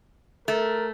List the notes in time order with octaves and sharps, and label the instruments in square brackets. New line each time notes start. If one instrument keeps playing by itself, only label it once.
[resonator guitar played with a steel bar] A3 [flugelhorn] A#4